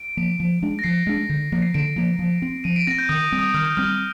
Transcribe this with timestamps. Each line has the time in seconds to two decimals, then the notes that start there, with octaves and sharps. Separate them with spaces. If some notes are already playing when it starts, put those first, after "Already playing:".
Already playing: D7
0.17 F3 A#3
0.40 F3
0.62 G#3 D4
0.79 A#6
0.84 F3 C7
1.07 G#3 D4
1.29 D3
1.52 F3 A#3
1.62 C7
1.74 D3 D7
1.96 F3 A#3
2.19 F3
2.42 C4
2.64 F3 D#7
2.76 D7
2.87 C4 A#6
2.99 G6
3.09 D#3 D#6
3.32 G3 C4
3.39 D#6
3.54 D#3 F6
3.65 G6
3.77 G3 C4 F6